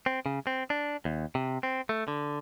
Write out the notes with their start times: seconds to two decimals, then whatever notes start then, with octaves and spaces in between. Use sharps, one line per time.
0.06 C4
0.26 C#3
0.47 C4
0.70 D4
1.05 D#2
1.35 C3
1.63 C4
1.89 A3
2.08 D3